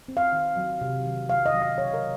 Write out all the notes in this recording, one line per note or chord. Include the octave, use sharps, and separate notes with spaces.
C4
F5
D#3
F#3
C3
D#3
F#3 F5
D#5
F#3
D#5
C#3 C#5
A#4